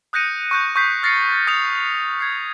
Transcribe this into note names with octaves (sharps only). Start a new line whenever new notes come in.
D#6 F#6 G6 A#6 C#7 D#7
C#6 F#6 G6
C#6 D#6 G6 B6 C7
F6 A6 A#6 C7 C#7
D#6 G6 A6 A#6 C#7 F7
G#6 C7